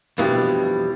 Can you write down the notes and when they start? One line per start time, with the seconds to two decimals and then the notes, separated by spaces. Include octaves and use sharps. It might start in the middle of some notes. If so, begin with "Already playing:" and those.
0.18 F2 B2 E3 G3 D4